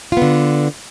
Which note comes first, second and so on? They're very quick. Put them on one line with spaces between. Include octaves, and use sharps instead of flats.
F4 B3 D3